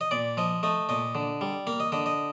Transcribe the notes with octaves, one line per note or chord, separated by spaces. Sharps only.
D#5
A#2 D5
F3 D#5
A3 D#5
A#2 D#5
D3
G3
A#3 F5
D#5
D3 D#5
D#5